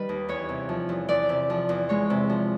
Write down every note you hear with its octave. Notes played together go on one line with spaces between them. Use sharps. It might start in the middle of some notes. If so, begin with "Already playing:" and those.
Already playing: D#3 G3 B4
D#2
E2 C#5
C3
F3
E2
E2 D5
C3
F3
E2
G#3 C#5
C3
F3